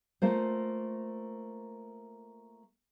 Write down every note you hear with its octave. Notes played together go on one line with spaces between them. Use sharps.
A3 A#3 F4 C5